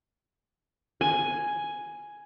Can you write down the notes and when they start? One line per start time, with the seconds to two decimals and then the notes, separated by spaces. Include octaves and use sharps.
1.01 G#5